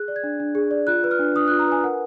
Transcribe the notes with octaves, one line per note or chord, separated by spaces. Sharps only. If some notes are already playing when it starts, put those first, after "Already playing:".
Already playing: G#4 F#6
D5
G#6
D4
D4
G#4
D5
F4 F#6
B4
F6
D4
D4 D#6
F4 F#6
A#5
B4 G#5
A#4 F#5